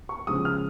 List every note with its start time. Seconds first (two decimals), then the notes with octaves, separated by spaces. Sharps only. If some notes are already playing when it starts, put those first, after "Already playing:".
0.09 C#6
0.27 C#3 F3 G#3 D#6
0.45 F6